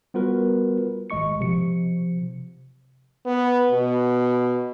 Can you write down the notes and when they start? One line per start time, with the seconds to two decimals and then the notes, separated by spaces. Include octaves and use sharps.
0.14 G3 B3 F4 F#4 A#4 B4
1.10 G#1 G#3 D#5 C#6 C#7
1.41 C3 F3 C#7
3.26 B3
3.71 B2